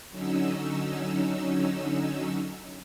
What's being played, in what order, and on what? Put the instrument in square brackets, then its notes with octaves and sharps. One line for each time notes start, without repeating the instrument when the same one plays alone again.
[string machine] D3 F#3 C#4 D#4 E6